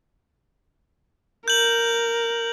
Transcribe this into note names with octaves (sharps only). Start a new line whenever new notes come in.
A#4 G6 F#7